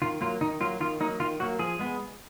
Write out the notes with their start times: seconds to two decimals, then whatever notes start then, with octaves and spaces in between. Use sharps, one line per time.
0.02 D#3 F4
0.21 F#3 A#3 F4
0.41 D#3 D#4
0.61 F#3 A#3 F4
0.80 D#3 F4
1.00 F#3 A#3 D#4
1.20 D#3 F4
1.40 F#3 A#3 F#4
1.59 F3 G#4
1.79 G#3 B3